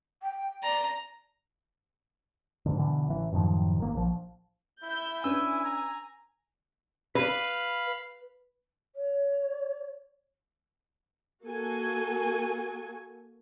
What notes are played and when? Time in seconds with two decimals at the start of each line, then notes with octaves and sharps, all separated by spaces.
0.22 G5
0.63 D5 A#5
2.66 G#2 D3
2.78 B2 D3 E3
3.08 A1 E3
3.32 F#2 A2 D#3 F3
3.78 G1 D#3 A#3
3.94 A#1 F3
4.83 E4 E5 G6
5.24 C#4 D4 B4 G#5 E6
5.64 A#5
7.15 B4 F5 B5
8.96 C#5
11.44 A#3 F#4 A4 G#5